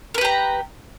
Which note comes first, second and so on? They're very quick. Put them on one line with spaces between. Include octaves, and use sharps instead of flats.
A#4 B4 G4 A#5